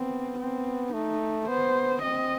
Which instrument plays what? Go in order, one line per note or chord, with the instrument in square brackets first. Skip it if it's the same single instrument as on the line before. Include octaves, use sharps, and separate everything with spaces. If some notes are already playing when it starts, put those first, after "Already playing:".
Already playing: [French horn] B3 [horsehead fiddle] C4
[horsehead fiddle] C4
[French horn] A3 [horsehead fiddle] D#4
[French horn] B3 [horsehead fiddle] C5
[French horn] C4 [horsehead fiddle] D#5